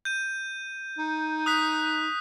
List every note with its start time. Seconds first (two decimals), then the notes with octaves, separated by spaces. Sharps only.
0.05 G6 D#7
0.98 D#4
1.46 D#6 F#6 B6